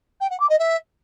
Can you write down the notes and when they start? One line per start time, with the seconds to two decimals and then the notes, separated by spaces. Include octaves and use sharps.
0.21 G5
0.30 F#5
0.40 D6
0.50 D#5
0.59 E5